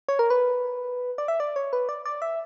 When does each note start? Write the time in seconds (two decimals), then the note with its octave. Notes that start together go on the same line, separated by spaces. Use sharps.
0.09 C#5
0.19 A#4
0.30 B4
1.18 D5
1.28 E5
1.40 D5
1.56 C#5
1.73 B4
1.89 D5
2.05 D5
2.22 E5